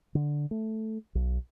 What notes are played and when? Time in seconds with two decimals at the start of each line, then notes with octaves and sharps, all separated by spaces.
0.15 D3
0.51 A3
1.15 B1